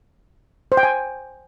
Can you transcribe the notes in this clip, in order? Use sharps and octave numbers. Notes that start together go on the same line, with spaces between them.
C5
G5
G#5